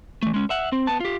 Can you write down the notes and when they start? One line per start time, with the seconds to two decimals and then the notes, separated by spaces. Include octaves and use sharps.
0.23 E3 A3
0.34 G#3 C#4
0.50 E5 F#5
0.72 C4
0.87 B3 A5
1.00 F4 G4